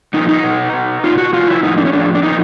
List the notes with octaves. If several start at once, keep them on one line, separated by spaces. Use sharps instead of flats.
A#2 F3 D#4
D#4
B2
B2
B2 F4
F#4
C3 F3 F4
E4
A2 F3 D#4
D4
C#4
A2 F3 D4
D4
A#2 F3 D#4